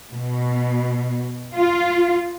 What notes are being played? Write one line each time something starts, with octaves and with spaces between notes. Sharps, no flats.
B2
F4